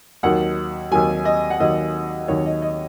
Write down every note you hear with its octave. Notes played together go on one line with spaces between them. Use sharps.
D#2 D#3 F#3 F#5
D#2 D#3 F#3 G#5
D#5
F#5
D#2 D#3 F#3 D#5
D#2 D#3 F#3 C#5
D#5
D#5